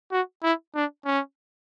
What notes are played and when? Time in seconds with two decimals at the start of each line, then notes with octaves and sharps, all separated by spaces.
0.12 F#4
0.43 E4
0.75 D4
1.05 C#4